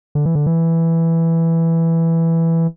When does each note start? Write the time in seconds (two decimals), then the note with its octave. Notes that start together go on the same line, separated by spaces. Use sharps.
0.15 D3
0.26 E3
0.35 D3
0.46 E3